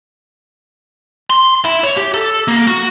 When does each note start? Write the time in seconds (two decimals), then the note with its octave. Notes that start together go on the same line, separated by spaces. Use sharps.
1.30 C6
1.65 E4
1.84 C#5
1.97 G4
2.14 A4
2.48 A#3
2.68 F#4